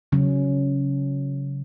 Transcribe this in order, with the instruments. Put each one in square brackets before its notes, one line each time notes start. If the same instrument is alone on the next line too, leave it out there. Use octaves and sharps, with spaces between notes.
[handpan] C#3 F#3 C#4